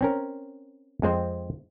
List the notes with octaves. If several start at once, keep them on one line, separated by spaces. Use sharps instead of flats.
C4 C#4 A#4
F2 G#3 C4 C5